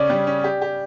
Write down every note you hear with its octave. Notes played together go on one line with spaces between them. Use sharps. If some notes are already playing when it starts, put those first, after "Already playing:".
Already playing: C#3 C#4 D5
G3
C#4
G4
G4